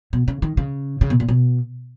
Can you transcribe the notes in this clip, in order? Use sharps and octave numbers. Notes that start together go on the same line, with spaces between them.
B2
C#3
D#3
C#3
C#3
B2
A#2
B2